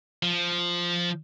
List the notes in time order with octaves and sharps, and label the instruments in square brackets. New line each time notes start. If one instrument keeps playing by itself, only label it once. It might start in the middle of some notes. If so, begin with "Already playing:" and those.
[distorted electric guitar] F3